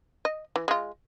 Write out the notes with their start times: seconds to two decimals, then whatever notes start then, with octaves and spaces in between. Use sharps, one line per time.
0.25 D#5
0.56 E3
0.68 G#3 F4